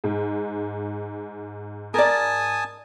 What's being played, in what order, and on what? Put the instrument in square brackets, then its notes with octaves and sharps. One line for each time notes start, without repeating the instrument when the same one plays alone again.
[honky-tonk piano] G#2
[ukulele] A#4 D5 [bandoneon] G#5 A5 D#6